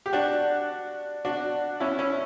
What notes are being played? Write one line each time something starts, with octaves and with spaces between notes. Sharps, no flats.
G4
D4 F#4
D4 F#4
C#4 E4
C#4 E4